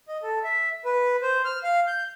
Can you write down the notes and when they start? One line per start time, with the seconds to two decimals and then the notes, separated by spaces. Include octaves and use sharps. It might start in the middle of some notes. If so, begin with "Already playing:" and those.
0.08 D#5
0.23 A4
0.44 E5
0.85 B4
1.22 C5
1.45 F6
1.63 F5
1.87 G6